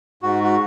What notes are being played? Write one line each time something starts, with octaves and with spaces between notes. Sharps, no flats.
G#2 F#4
F#4